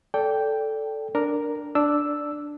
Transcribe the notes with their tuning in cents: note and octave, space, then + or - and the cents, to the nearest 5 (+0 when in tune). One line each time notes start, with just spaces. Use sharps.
A4 +0 D5 -20 G5 +0
D4 +0 A#4 +0
D4 +0 E6 +0